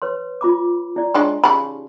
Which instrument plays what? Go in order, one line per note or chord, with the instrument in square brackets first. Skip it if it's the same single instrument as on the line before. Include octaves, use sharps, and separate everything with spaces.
[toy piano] B4 C#5 C6
F4 B5 D6
E4 D5
[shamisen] G#3 D4 C#5
[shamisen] C#3 B5 [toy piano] D#4 G4 C6